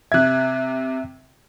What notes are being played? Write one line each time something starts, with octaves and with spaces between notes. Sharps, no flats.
C3 E5 F#6 G#6